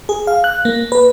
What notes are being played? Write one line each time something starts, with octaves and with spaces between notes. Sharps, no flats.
G#4
F5
F#6
A#3
B4